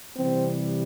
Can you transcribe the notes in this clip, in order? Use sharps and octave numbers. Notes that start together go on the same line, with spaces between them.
C3 E3 G3 C4